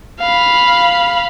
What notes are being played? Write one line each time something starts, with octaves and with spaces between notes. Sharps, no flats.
F5 B5